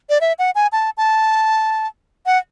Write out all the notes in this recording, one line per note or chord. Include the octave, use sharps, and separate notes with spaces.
D5
E5
F#5
G#5
A5
A5
F#5